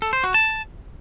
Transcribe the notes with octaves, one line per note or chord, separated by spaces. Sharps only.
A4
C5
F#4
A5